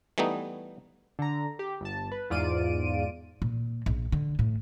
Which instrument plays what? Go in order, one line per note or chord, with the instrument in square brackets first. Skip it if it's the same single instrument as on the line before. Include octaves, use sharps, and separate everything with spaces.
[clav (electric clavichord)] E3 G3 A3 B3 D#4
[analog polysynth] D3 A#5
G4
G1 A5
B4
E2 G#2 F4 D5 D7 D#7
[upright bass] A#2
A#1
D3
A2